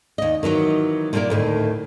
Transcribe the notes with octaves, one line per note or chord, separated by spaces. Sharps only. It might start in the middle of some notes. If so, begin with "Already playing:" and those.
D#2 D#5
D#3 E3 F#3 B3
A#2 G3 A#3 C4 E4 A#4
D2 A2 D#3